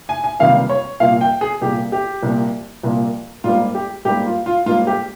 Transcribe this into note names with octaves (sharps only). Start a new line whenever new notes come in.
G#5
G#5
C#2 C3 D#3 G3 A#3 F5
C#5
C2 A#2 F3 A#3 F5
G5
G#4
C2 A#2 F3 A#3 G4
G4
C2 A#2 F3 A#3
C2 A#2 F3 A#3
G#2 G3 A#3 F4
G4
G#2 G3 A#3 G4
F4
F4
G#2 G3 A#3 F4
G4